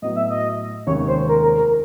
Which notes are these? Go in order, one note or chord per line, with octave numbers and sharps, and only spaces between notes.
A2 F#3 B3 D#5
E5
D#5
F1 D#2 D#3 G#3 C#4 C#5
C5
A#4
A#4
A#4